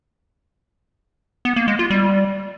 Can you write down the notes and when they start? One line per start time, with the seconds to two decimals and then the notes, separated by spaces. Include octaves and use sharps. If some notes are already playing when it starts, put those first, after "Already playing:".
1.45 B3
1.56 A#3
1.68 G#3
1.79 F4
1.90 G3